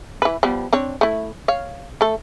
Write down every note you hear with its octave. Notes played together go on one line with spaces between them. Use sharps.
E3 B4
F3 G3 B3
C4 D4 C#5
A3 E4
C#5 F5
A3 A4